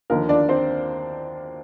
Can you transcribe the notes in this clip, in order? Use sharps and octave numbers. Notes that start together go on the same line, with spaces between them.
D#2 D3 F3 A#3 A#4
D4 D5
C4 C5